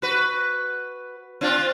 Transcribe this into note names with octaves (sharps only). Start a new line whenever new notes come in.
F#4 B4
C4 D4 F4